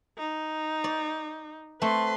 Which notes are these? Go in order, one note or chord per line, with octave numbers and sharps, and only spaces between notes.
D#4
D5
A3 C4 B4 C6